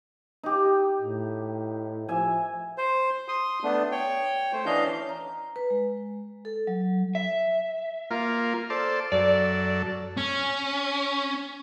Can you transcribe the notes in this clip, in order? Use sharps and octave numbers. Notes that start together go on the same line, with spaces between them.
D#4 G4
A2
F3 E5 G#5
C5
C6 D#6
A3 B3 D4
C#5 G5
A3 C5
E3 C#4 D4 D#5 F5 G6
A#5
B4
G#3
A4
F#3
E5
A#3 F4
A4 C5 D5
F#2 A4 D5
C#4